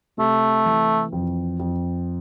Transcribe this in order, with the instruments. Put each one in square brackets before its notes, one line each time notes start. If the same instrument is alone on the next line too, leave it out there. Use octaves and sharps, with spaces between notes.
[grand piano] C3 [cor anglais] A3
[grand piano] E3
F2
F2